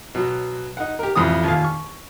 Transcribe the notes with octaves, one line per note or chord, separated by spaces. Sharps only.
B2 F#3
D#4 F#5
G4 A#4
A1 F2 E4 D#6
D#2 A#2 F5
C#6